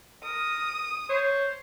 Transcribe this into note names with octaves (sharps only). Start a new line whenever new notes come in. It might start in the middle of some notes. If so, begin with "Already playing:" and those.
A#4 D#6
C5 C#5